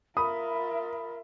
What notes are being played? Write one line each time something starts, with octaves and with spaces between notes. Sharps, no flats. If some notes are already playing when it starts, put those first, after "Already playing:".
F4 A#4 E5 B5 D#6